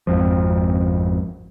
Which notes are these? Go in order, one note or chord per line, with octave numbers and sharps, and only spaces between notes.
G#1 F2 F3